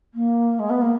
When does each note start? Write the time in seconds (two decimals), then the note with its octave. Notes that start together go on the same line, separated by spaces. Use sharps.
0.14 A#3
0.59 G#3
0.69 B3
0.81 A#3